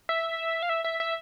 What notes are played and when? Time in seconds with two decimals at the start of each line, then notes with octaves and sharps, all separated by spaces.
0.09 E5
0.62 F5
0.69 E5
0.84 E5
1.00 E5